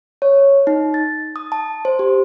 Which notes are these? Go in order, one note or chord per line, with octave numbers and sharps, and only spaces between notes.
C#5
D#4
A6
D#6
A5
C5
G4